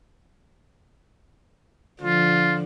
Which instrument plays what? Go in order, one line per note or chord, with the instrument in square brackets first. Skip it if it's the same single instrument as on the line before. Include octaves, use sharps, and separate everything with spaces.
[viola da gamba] D3 F3 [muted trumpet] F4